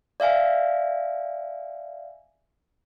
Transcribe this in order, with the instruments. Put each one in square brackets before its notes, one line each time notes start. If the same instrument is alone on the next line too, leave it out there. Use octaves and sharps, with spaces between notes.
[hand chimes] D5 E5 F5 G#5